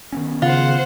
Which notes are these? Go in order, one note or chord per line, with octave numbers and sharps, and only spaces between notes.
D#3 B3 C#4
C#3 F4 C5 F#5